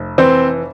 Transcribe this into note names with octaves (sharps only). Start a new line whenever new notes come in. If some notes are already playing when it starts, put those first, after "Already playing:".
Already playing: F1
E3 C4 C5